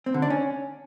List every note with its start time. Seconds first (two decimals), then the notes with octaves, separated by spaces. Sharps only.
0.06 C4
0.14 D3
0.22 D4
0.30 C#4